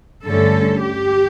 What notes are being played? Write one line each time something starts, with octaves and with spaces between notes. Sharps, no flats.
G2 D3 A3 C#4 A4
G4